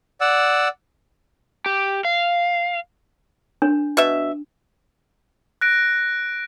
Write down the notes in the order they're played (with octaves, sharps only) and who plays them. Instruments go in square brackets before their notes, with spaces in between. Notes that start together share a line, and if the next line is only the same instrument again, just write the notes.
[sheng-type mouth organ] D5 F#5 E6
[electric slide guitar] G4
F5
[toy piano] D4
[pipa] B2 E5
[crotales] F#6 A#6 D7